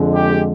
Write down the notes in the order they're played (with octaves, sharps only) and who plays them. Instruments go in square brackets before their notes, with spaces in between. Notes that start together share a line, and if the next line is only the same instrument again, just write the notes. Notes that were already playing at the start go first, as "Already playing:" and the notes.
Already playing: [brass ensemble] F2 D3 G#3
G4